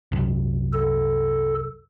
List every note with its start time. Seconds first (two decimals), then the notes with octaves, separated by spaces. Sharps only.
0.12 C2 F#2
0.73 A4